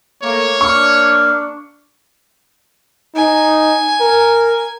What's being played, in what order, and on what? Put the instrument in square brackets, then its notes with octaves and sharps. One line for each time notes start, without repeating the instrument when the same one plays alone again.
[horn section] A3 A#3 [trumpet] C#5
[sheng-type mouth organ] A#3 [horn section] D4 [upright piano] C#6
[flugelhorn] D#4 [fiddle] G#5
[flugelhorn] A#4